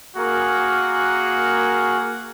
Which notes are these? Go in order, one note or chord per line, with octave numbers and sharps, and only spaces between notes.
A#3 F#4 G#4 A#4